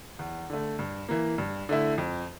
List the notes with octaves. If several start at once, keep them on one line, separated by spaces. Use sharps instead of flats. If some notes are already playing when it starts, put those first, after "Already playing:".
E2
D3 A3
G2
E3 A#3
G2
D3 A3 E4
F2